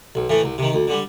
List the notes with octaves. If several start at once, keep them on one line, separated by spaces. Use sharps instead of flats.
B1
A2 E3 A3
C2
C3 D#3
D2
D3 G3